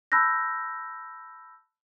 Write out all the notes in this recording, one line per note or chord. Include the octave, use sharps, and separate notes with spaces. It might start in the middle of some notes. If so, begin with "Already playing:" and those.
A5 B5 E6 F#6 G6 A#6